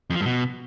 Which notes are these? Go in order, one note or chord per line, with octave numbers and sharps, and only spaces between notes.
F2
F3
G2
B2